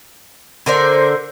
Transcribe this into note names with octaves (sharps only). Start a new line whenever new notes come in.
D3 A#4 C5 D5